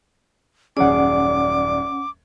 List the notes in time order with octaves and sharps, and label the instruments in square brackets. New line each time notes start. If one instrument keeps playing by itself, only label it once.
[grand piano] D#1 F#2 G#4 [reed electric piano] C#4 F#5 [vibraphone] D5 [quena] D6